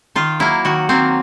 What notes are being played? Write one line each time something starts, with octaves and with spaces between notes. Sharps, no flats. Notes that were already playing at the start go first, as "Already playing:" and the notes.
D#3 F4
F#3 A#3 E4
D#3 F#4
F#3 A#3 C4